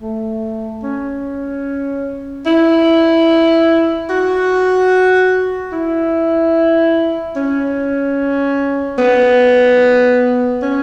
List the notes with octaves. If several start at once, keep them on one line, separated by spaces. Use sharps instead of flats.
A3
C#4
E4
F#4
E4
C#4
B3
C#4